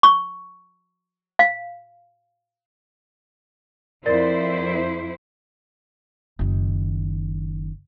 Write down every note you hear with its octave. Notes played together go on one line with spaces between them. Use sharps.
C#6
F5
F2 E4 A#4 C5 D5 A6
F#1 D#3